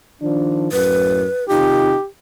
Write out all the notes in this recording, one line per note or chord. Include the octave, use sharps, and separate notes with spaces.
D#3 F3 D4
F#2 A2 B4
C3 D#3 D#4 F4 G4